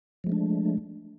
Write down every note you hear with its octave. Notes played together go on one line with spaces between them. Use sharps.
F3 G#3 A3 D4